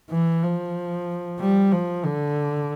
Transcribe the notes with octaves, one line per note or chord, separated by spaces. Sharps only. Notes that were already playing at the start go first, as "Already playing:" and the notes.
E3
F3
G3
F3
D3